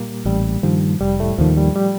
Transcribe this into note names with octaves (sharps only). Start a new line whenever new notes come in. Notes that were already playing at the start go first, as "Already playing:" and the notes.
Already playing: A#2 G3 A#3 G4
A1 G3
G2 D#3 F3 G3
F1 G3
A2 A3
D#2 D#3 F3
G3
G3